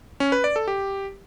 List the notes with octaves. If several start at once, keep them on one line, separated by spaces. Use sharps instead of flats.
C#4
B4
D5
A4
G4